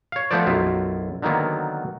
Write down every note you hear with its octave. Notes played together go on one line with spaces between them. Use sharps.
C#5 F5
F3 A3 B3 A4 C5 D5
B1 F#2 E4 F4
D3 D#3 F#3 A#3 B3